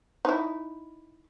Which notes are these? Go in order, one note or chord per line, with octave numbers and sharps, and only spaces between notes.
D#4 E4